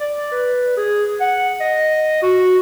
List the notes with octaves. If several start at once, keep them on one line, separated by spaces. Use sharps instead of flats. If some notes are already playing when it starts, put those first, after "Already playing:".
D5
B4
G#4
F#5
D#5
F#4